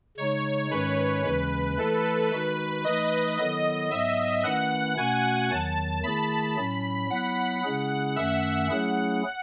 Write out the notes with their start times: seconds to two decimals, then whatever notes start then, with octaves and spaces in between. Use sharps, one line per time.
0.18 C#3 G#3 D#4 C#5
0.71 G#2 D#3 G#3 C#4 B4
1.24 D#2 C#3 E3 G#3 C#4 B4
1.77 E3 A3 E4 A4
2.31 D#3 G#3 D#4 F#4 B4
2.84 E3 A3 D#4 D#5
3.38 D#3 F#3 B3 E4 A4 D#5
3.91 G#2 F#3 B3 E5
4.43 D#3 A3 C#4 E4 B4 F#5
4.97 B2 A3 C#4 F#4 G#5
5.50 E2 D#3 F#3 A5
6.03 D#3 A3 E4 G#4 B5
6.57 A2 F#3 C#4
7.10 F#3 B3 E4 F#5
7.64 C#3 G#3 C#4 E4 G#4
8.16 F#2 D#3 A3 C#4 E5
8.70 F#3 A3 C#4 E4 G#4 F#5